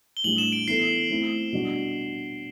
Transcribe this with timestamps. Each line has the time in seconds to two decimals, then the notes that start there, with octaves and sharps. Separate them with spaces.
0.17 G7
0.24 A2 G3 D4 F#7
0.38 E7
0.52 D7
0.67 E3 B3 E4 A4 C7
1.10 A3 C4 E4
1.53 B2 G3 D4 F#4